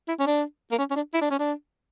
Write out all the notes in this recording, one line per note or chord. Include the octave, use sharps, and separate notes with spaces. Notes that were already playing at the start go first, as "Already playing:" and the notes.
E4
C#4
D4
A#3
C#4
C#4
D4
E4
D4
C#4
D4